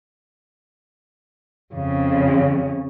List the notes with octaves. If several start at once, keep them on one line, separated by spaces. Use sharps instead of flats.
F2 C#3